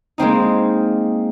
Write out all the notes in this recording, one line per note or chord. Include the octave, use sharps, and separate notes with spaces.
G#3 A#3 C4 D#4